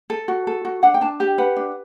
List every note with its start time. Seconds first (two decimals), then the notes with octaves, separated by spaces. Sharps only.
0.10 A4
0.28 F#4
0.47 A4
0.65 F#4
0.83 D4 F#5
0.94 G5
1.01 D4 A5
1.20 G4 G5
1.38 B4 F#5
1.56 D4